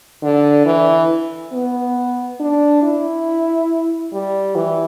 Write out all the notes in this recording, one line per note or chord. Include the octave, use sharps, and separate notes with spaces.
D3
E3
B3
D4
E4
G3
E3